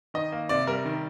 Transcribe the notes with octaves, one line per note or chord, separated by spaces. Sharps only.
D#3 D#5
A#3
C3 D5
G3 A#4
D#3